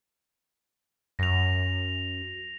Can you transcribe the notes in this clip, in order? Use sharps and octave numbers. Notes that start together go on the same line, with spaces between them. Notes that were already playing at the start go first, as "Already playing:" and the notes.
F#2 A#6 F7